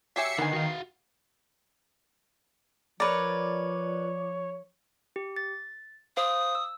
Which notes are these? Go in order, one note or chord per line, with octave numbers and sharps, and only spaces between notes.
F#3 G4 E5 G#5 C7 C#7
D3 D#3 B3 G#5
F#4 F5
F3 A#4 B4 C#5 D5
G4
A6
C5 F5 D#6
E6